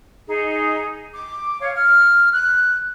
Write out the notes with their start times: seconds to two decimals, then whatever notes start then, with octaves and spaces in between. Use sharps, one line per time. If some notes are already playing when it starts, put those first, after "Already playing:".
0.27 D#4 G#4
1.14 D6
1.60 C#5 F5
1.74 F6
2.32 F#6